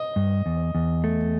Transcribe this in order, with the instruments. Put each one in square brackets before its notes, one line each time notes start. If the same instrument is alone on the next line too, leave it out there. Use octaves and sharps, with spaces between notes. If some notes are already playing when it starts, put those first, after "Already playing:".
Already playing: [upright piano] D#5
[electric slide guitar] G2
E2
E2
A3